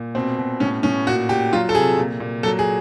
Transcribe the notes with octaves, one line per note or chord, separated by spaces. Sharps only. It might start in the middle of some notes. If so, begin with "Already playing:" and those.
Already playing: A#2
B2 C4
B2
A2 C#4
A2 C#4
A#2 F#4
A#2 G4
F#3 F4
A4
C3 G#4
A#2
A#2
F#3 A4
G#4